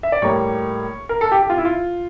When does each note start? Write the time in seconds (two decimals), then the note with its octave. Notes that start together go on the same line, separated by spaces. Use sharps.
0.03 E5
0.12 D5
0.22 A2 G3 A#3 C#5
1.09 A#4
1.21 A4
1.32 G4
1.42 G4
1.50 F4
1.58 E4
1.65 F4